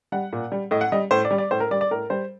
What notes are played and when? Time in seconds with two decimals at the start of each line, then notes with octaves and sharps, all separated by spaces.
0.12 G3 F#5
0.33 A#2
0.52 G3
0.71 A2 D#5
0.81 F#5
0.92 G3 D#5
1.11 A2 C5
1.25 D5
1.31 G3
1.38 D5
1.51 A2 C5
1.60 A#4
1.71 G3 D5
1.81 D5
1.91 A2 A#4
2.10 G3 C5